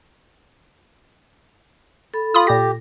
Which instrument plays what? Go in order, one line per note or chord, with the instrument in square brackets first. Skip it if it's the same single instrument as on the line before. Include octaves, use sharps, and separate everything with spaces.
[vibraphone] A4 B5
[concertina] F4 [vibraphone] A4 [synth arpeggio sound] B5 D#6
[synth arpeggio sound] A#2 A#6 [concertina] G4